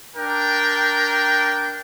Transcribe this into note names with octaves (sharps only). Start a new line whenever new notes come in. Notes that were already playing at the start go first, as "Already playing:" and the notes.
D4 A#4 G5